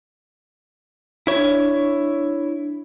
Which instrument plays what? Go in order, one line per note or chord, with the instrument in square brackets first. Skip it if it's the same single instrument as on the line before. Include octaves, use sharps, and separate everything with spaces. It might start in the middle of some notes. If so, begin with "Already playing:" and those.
[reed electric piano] D4 [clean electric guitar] E4 C#5